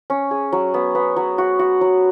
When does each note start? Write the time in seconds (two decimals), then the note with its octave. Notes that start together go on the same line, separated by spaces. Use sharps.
0.10 C#4
0.31 G#4
0.53 F#3
0.74 B3
0.95 B3
1.17 F#3
1.38 F#4
1.59 F#4
1.81 F#3